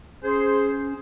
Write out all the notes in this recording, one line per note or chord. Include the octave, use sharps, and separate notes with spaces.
C#4 G#4 C5